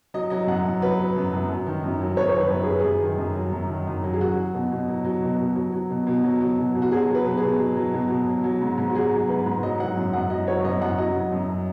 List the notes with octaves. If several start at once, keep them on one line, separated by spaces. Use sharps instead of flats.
F#3 D#5
F#3 D#5
F#2 F#5
F#2
F#3 B4
F#3
F#2
F#2
F#2
D#3
F#2
F#3
F#2 C#5
C#5
D#3
B4
F#2
G#4
F#3 B4
F#2 G#4
D#3
F#2
F#3
F#2
D#3
F#2
F#3
G#4
F#3 F#4
F#3
B2
B2
F#3
F#3
B2
B2
F#3
F#3
B2
B2
F#3
F#3
B2
B2
F#4
F#3 G#4
F#3
B4
B2
B2 G#4
F#3
F#3
B2
B2
F#3
F#3
G#2
G#2
F#4
F#3 G#4
F#3
G#2 B4
G#2
F#3 D#5
F#3 F#5
F#2
F#2 F#5
F#3 D#5
F#3 C#5
F#2 D#5
F#2 F#5
F#3 D#5
F#3
F#2